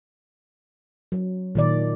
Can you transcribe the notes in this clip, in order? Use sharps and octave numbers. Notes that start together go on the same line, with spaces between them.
F#3
A#2 D#3 D5